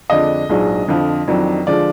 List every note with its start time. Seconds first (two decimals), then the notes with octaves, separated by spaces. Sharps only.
0.10 F2 D3 G#3 D4 D#5
0.49 A#1 G#2 F#3 D4 G#4
0.88 F2 D3 F3
1.28 F2 D#3 F#3 D4
1.66 D3 F3 G#3 D5